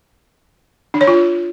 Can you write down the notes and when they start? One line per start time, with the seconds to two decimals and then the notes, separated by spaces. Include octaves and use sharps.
0.94 D4
1.01 C#5
1.08 F4